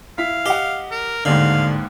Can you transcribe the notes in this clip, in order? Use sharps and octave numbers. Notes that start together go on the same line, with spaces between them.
E4 F5 B6
G4 D#5 F#5
A#4
A1 D#2 G#2 D3 F5